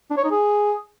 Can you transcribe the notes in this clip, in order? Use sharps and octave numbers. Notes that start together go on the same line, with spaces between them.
D4
C#5
D#4
G#4